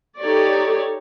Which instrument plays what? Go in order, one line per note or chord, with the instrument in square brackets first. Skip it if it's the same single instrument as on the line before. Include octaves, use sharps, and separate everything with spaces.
[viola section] D#4 G4 A4 C#5 D5